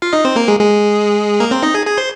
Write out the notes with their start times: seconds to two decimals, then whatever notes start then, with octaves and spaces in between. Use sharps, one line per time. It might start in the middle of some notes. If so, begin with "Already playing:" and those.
0.02 F4 F5
0.13 D#4 D#5
0.25 C4 C5
0.36 A#3 A#4
0.48 G#3 G#4
0.59 G#3 G#4
1.40 A#3 A#4
1.51 C4 C5
1.63 D#4 D#5
1.74 G#4 G#5
1.86 G#4 G#5
1.97 C5 C6